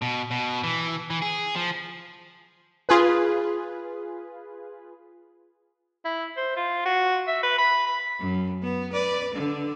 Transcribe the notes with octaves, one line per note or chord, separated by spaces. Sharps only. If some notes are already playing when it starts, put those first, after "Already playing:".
B2
B2
E3
E3
G#4
F3
F4 G#4 B4
E4
C5
F4
F#4
E5
B4
B5
B5
F#2
B3
B4 D5
D3